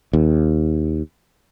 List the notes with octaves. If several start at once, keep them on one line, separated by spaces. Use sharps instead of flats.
D#2